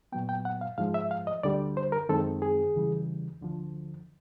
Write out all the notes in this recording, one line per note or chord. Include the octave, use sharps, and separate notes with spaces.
A#2 F#3 B3 G5
G5
F#5
F5
G#2 F3 G#3 F5
E5
F5
D#5
D2 D3 G3 D5
C5
A#4
F#2 D#3 G#3 C4 A4
G#4
E2 C#3 E3 G3
D2 D3 F3